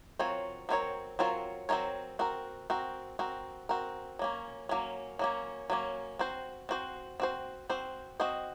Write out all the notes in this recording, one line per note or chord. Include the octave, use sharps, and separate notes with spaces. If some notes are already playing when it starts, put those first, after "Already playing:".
F#3 C4 F4 A#4 C#5
F#3 C4 F4 A#4 C#5
F#3 C4 F4 A#4 C#5
F#3 C4 F4 A#4 C#5
C4 F#4 A#4
C4 F#4 A#4
C4 F#4 A#4
C4 F#4 A#4
F#3 A#3 C#4
F#3 A#3 C#4
F#3 A#3 C#4
F#3 A#3 C#4
C4 F#4 C5
C4 F#4 C5
C4 F#4 C5
C4 F#4 C5
C4 F#4 C5 D#5